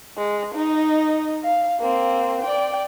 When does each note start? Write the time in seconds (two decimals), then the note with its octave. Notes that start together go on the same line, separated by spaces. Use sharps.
0.17 G#3
0.55 D#4 D#5
1.44 F5
1.80 A#3 C4
2.44 D5 G5